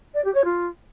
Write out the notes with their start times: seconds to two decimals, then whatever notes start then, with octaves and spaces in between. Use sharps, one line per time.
0.14 D5
0.24 G4
0.34 C#5
0.44 F4